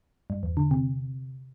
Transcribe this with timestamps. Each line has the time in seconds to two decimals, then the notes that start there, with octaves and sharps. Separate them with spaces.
0.30 G2
0.43 E2
0.57 D3
0.71 C3